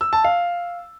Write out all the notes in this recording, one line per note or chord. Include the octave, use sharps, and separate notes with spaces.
E6
A5
F5